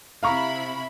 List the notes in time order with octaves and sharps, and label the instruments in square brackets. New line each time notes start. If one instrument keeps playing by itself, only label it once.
[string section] C3 E4 B5 [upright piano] F5 A#5 C#6